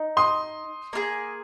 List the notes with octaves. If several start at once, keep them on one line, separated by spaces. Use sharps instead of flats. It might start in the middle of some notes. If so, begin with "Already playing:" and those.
Already playing: D#4
C6 D#6
A#3 F4 G#4